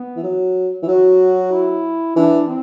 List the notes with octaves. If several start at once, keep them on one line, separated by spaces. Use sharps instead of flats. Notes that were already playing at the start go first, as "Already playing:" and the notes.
Already playing: B3
E3
F#3
E3
F#3 F#4
E4
E3 D4
C4